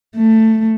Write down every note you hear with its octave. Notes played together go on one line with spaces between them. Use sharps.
A3